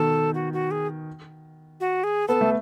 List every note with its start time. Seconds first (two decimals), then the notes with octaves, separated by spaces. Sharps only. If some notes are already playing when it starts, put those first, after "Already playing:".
Already playing: B2 D#3 A4
0.34 F#4
0.53 F#4
0.71 G#4
1.80 F#4
2.04 G#4
2.28 B3 A4
2.41 A3